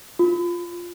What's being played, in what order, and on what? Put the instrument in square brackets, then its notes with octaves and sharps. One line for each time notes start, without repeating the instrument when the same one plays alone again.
[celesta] F4